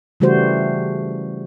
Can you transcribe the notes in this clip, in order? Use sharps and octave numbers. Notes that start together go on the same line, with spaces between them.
C#3 E3 G3 A3 F#4 C5